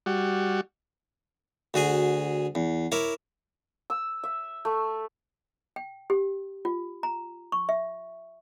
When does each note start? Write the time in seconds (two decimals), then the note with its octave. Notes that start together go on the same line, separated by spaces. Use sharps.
0.06 G3 F#4
1.74 D2 F#4 G#4 G#5
2.55 E2
2.92 E4 A#4 C#5 D6
3.90 E6
4.23 E5
4.65 A3
5.76 G5
6.10 G4
6.65 F4
7.03 A#5
7.52 C#6
7.69 E5